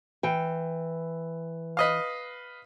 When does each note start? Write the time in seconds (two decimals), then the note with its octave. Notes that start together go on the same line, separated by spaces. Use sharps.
0.23 E3 G5
1.77 B4 D#5 F5